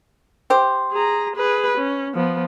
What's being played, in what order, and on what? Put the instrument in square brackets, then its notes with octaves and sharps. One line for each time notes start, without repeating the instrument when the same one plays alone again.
[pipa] G4 C5
[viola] G#4 A#5
G#4 B4
C#4
F3 B3